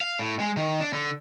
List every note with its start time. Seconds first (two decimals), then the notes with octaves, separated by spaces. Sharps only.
0.01 F5
0.19 A2
0.40 G#3
0.57 D#3
0.80 D4
0.93 D3